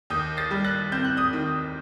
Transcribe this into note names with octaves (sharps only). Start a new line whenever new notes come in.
D#2 D#6 G6
A6 C7
G3
F#6 A6
C4 G6
F#6
D#6 G6
D#3